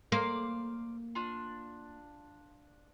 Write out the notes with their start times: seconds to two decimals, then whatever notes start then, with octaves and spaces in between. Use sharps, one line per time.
0.12 A#3 C5 D5 F5
1.15 D4 F4